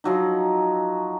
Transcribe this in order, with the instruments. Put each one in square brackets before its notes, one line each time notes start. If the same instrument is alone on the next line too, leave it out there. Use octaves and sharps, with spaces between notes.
[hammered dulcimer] F3 F#3 D#4